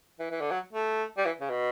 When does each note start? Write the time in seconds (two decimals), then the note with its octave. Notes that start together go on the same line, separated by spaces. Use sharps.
0.19 E3
0.31 E3
0.41 D3
0.51 F#3
0.73 A3
1.17 G3
1.25 E3
1.41 C#3
1.50 B2